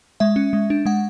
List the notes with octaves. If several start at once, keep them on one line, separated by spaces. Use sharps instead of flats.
G#3 E5
C#4
G#3
D4
G#3 F#5